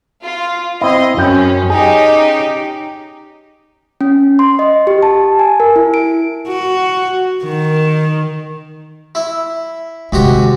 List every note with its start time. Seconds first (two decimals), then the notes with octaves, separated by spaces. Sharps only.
0.22 F4
0.81 C4 E4 D#5 C6
1.17 F#2 C#4 G5
1.70 C#4 D#4 G4 G#4
4.01 C#4
4.39 C6
4.59 D#5
4.87 G4
5.03 A5
5.39 G#5
5.60 A#4
5.76 E4
5.94 D7
6.48 F#4
7.44 D#3
9.15 E4
10.12 G#2 C3 D#3 F#4 G4